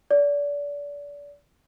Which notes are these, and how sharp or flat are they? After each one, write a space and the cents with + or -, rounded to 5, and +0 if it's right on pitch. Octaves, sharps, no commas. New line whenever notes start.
D5 -30